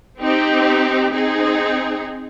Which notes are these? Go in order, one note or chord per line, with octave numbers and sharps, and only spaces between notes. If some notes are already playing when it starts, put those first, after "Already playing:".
C4 D#4 G4
C4 D#4 G#4